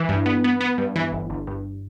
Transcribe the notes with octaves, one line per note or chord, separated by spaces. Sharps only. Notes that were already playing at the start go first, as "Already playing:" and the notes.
Already playing: E3
G2
B3
B3
B3
G2
E3
G1
G1
G2